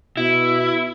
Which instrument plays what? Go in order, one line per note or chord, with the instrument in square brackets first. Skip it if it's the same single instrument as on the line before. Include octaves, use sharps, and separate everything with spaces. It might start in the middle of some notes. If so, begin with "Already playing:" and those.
[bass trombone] B2 [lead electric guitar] E4